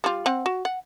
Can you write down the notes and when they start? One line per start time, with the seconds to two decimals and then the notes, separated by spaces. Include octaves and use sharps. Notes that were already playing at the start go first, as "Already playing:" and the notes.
0.04 G3 F4
0.26 C4 F#5
0.46 F#4
0.65 F#5